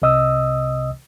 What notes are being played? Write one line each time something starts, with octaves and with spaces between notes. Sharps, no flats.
C2 C3 D#5 D#6 E6